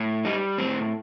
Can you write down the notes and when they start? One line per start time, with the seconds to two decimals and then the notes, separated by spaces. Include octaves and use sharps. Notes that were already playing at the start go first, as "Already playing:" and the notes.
Already playing: A2
0.25 G3 D#4
0.58 A2 C4